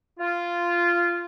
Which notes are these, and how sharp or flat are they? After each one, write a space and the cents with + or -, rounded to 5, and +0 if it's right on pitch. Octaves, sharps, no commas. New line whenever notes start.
F4 -10